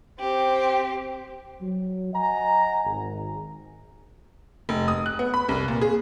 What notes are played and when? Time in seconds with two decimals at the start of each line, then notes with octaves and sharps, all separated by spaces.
0.19 C4 G4
1.61 F#3
2.13 D#5 F#5 G#5 A#5
2.85 G#1
4.69 F1
4.88 D#6
5.06 F#6
5.19 B3
5.34 B5
5.49 C2
5.68 A#2
5.81 G#4